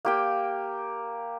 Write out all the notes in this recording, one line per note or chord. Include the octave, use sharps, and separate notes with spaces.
A#3 G4 G5